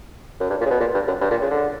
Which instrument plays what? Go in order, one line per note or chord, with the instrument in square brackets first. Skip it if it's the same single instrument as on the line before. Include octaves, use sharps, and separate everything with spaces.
[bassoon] F#2
G2
A#2
C#3
B2
A#2
G2
F#2
G2
A#2
C#3
D3